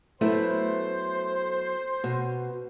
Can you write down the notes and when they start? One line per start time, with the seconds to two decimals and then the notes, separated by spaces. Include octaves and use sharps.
0.21 F#3 A3 B3 E4 C5
2.04 B2